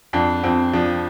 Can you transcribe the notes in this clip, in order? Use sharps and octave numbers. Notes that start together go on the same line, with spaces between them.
F2 D4
F2 C4
F3 D4